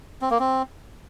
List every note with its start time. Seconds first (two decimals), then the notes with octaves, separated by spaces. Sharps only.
0.22 C4
0.31 A#3
0.39 C4